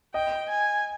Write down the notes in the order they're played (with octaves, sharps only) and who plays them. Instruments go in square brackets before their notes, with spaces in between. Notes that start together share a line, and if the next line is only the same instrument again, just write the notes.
[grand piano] D#5 [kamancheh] G5
[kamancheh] G#5